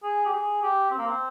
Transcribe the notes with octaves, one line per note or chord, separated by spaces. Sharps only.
G#4
G4
G#4
G4
C4
A#3
C4